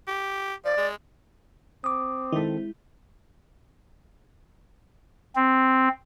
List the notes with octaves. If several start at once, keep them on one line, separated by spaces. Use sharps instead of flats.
G4
F3 D5
G#3
C4 D6 D#6
D#3 G#3 E4 A4
C4